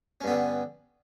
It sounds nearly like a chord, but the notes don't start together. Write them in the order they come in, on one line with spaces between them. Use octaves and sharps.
C#4 G2 B3 D3